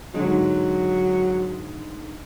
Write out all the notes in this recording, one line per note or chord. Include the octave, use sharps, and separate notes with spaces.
G#2 D3 F#3 G#3